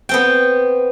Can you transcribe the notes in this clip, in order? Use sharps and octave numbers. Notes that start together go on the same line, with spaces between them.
B3 C4 G5